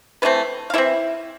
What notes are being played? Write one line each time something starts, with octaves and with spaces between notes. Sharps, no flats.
E3 A3 B3 C4 B4
F5
E3 A3 C4 E4 E5